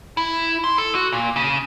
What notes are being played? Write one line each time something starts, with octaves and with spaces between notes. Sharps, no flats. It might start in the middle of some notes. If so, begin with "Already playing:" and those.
E4
C6
A4
F#4
A#2
C#3